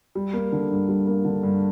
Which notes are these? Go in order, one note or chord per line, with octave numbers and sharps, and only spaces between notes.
G3
A#3
D3
G2
G3
A#3
D3
G2